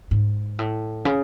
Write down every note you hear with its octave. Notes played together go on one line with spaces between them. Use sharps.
G#2
A2
C#3